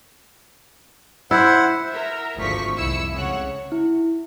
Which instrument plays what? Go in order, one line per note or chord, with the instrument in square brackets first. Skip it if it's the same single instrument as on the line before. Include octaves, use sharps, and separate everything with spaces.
[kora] E4 [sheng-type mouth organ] C5 F#5
[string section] A#4 E5
G#1 D2 F3 C#6 B6
C2 F2 E4 E6 C#7
C#2 C#3 C#5 F#5
[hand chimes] E4